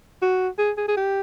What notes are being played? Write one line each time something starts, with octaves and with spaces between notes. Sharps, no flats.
F#4
G#4
G#4
G#4
G4